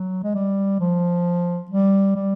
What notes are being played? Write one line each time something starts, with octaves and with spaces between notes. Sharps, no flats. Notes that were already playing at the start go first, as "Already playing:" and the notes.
Already playing: F#3
G#3
G3
F3
G3
G3